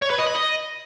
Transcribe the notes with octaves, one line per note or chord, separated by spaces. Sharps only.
C#5
B4
D#5
B5
D#5